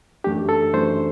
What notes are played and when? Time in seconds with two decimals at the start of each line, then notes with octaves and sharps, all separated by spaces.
0.24 F#2 E3 A3 D4 G4
0.49 A4
0.73 F#2 E3 A3 D4 C5